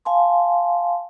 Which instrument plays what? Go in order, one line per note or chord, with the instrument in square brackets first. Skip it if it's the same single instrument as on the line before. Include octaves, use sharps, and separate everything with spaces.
[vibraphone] F5 G#5 A5 C6